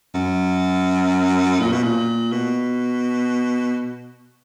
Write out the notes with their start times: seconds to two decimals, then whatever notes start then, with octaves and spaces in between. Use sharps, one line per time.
0.14 F#2
1.60 A#2
1.72 B2
1.83 A#2
2.32 B2